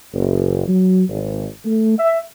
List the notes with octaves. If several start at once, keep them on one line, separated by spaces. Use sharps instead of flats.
F#1
F#3
G#1
A3
E5